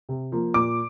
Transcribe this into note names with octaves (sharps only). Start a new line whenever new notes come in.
C3
F3 A#3
A#2 D6